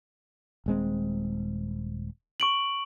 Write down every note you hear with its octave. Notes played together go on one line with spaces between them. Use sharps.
D#1 G#3 C4
C#6 D7 F#7